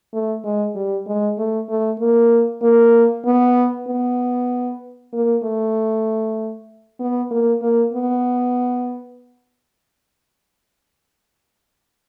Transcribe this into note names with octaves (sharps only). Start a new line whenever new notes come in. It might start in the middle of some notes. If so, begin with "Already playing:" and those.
A3
G#3
G3
G#3
A3
A3
A#3
A#3
B3
B3
A#3
A3
B3
A#3
A#3
B3